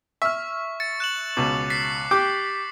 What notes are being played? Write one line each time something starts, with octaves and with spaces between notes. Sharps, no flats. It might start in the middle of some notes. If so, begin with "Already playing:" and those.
E5 C#6 F6
A6 C#7
F#6 E7 F#7
C#2 B2 D6
A6 B6 C7
G4 G5 D6